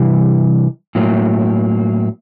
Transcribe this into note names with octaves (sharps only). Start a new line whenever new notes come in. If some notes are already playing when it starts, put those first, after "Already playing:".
Already playing: C3 E3 G3
A2 F#3 A#3